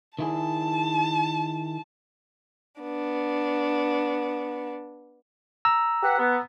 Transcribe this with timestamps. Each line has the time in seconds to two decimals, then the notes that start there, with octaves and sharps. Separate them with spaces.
0.19 D#3 E4 G#4 A5
2.81 B3 D4
5.65 A#5 E6
6.03 G4 B4 F#5
6.19 B3